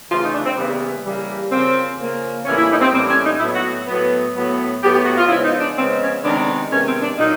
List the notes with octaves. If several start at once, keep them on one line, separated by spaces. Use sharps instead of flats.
C#3 E3 A3 F4
D#4
D4
C4
C#3 E3 G3 A#3 B3
C#3 E3 G3 A#3
C#3 F3 A#3 C4
C#3 F3 A#3
A2 E3 G3 A#3 C#4
E4
D#4
C4
A2 E3 G3 A#3 C4
C#4
D#4
A2 F#3 B3 E4
F#4
A2 F#3 B3
A2 F#3 B3
A2 F#3 B3 G4
G4
F#4
F4
C#3 F3 G#3 B3 E4
D#4
D4
C#3 F3 G#3 B3 C4
C#4
C3 D#3 G#3 B3 D4
C3 D#3 G#3 B3 C#4
C4
D4
A#2 F#3 A#3 D#4